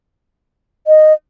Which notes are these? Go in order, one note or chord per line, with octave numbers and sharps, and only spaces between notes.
D#5